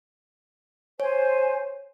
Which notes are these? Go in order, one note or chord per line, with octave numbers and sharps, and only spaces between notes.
C5 C#5 G#5